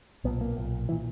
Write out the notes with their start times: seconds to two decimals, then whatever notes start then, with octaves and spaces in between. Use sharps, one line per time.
0.24 B1 B3
0.28 A#2
0.41 A#3
0.57 B1 A#2
0.89 E3
0.92 A#2